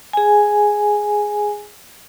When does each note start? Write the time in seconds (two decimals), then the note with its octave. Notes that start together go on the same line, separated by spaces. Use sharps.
0.13 G#4 G#5